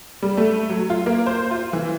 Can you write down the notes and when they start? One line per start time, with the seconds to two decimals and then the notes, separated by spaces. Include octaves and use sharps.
0.22 G3
0.37 A3
0.69 F#3
0.90 F4
1.06 A#3
1.27 C5
1.51 F4
1.73 E3